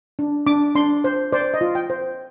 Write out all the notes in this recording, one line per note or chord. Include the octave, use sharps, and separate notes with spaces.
D4
D4 D6
D4 C6
C5
C5 D5
D#5
F4
G5
C5